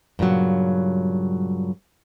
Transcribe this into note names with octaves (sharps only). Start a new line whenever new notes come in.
G2 A#2 C#3 F#3